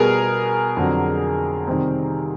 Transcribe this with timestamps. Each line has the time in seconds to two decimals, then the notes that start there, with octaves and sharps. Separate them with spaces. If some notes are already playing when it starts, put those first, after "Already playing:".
Already playing: B2 G3 B3 G#4 A#4
0.77 F2 D3 F#3
1.68 C3 D#3 G3 C4